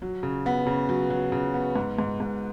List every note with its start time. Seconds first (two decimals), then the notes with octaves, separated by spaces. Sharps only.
0.02 F#3
0.23 C#3
0.46 B3
0.67 C#3
0.89 F#3
1.10 F#3
1.32 C#3
1.54 B3
1.76 G#2
1.99 G#2
2.20 G#2